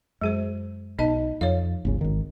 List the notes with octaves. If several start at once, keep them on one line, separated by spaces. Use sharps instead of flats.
F#2 G#3 G#4 C5
B1 D#4 D#5 A5
F2 C#5 F5
G1 C#2 C#3
G#1 D#3